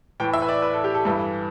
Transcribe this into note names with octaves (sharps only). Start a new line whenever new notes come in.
A2 E3 G5
E5
B4
D5
B4
A4
G4
A4
G2 E3 A4